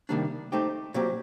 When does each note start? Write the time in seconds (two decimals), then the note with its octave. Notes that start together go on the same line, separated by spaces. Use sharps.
0.09 C3 D#3 G3 A#3 D4
0.52 A3 C4 D#4 G4
0.94 A#2 F#3 C4 G4